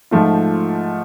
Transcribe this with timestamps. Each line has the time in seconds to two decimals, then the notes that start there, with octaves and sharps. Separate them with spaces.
0.11 G#2 F3 A3 F4